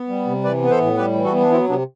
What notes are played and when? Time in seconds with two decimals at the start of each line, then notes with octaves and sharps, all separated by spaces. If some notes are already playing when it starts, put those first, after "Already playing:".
Already playing: B3
0.08 G3
0.26 C3
0.44 E3 B4 D5
0.62 B3 B4
0.71 A4 C5
0.80 A2
0.97 G3 G4 B4
1.15 E3
1.24 F#4 A4
1.33 B3
1.41 D4
1.51 F#3 C4 E4
1.69 C3 B3 D4